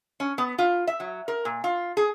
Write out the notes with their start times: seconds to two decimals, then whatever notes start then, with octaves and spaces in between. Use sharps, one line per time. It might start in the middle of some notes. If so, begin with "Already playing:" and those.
0.20 C#4
0.38 B3
0.58 F4
0.87 E5
1.00 F#3
1.28 A#4
1.45 A#2
1.64 F4
1.97 G#4